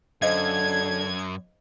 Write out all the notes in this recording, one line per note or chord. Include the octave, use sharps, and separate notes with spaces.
F#2 D3 C5 D#5 F5 G#6